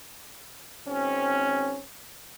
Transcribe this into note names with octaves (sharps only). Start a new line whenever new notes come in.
G#1 C4 C#4